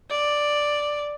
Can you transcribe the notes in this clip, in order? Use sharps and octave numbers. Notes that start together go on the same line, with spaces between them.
D5